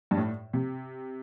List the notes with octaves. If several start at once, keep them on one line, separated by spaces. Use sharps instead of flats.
G2
A2
C3